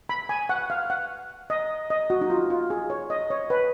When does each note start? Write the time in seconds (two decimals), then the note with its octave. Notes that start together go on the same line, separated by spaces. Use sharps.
0.09 B5
0.29 G#5
0.49 F#5
0.70 F5
0.90 F#5
1.50 D#5
1.90 D#5
2.10 F#4
2.21 D#4
2.30 F4
2.50 F4
2.70 G#4
2.90 C#5
3.10 D#5
3.30 C#5
3.50 B4